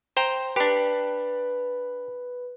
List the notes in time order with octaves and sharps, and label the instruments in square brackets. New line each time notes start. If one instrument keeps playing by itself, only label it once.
[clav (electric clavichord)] C5 G5 A#5
[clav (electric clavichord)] D4 G4 [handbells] B4 B5